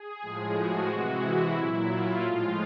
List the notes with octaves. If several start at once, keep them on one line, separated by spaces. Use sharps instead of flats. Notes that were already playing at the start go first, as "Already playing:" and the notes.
Already playing: G#4
A2 F3 G#3
F#4
C3 E3 G#3
E4
A#2 F#3
F4
A2 F3 G#3